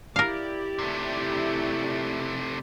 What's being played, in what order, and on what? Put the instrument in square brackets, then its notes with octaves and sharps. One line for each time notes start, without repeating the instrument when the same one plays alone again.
[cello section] E4 G4 D5 [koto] A#4 F5
[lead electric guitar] C3 A3